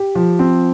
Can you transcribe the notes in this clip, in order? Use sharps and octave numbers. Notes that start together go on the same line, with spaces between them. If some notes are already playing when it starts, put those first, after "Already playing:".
Already playing: G4
F3
C4